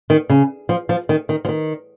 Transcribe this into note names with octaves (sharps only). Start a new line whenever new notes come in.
D#3
C#3
F3
F3
D#3
D#3
F3
D#3